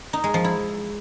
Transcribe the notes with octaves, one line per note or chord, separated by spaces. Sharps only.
D#4
G#3
F3
E4